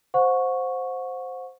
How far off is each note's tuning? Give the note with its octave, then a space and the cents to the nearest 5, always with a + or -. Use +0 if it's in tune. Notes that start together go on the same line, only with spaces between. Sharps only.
C5 +0 F#5 -35 C#6 +0